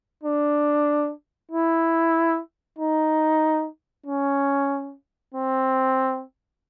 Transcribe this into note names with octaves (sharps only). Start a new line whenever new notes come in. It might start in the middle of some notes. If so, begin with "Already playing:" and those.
D4
E4
D#4
C#4
C4